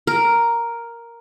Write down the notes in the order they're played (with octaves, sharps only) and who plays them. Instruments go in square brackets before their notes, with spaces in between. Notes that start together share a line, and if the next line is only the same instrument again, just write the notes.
[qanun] A#4